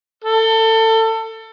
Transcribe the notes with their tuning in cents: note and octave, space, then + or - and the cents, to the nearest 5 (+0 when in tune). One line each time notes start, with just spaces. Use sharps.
A4 +25